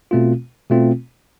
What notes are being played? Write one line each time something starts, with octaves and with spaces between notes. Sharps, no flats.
B2 A3 C4 F4
B2 A3 C4 F4